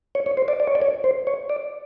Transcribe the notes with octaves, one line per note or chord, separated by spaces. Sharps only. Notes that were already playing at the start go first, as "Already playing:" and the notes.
C#5
C#5
C5
D5
D5
C#5
D5
C#5
C5
C#5
D5